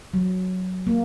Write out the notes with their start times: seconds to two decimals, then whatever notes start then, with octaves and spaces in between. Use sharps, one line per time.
0.14 F#3
0.87 A#3